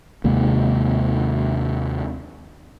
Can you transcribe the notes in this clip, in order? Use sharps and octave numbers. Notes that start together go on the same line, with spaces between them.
D#2 C3 G#3 A#3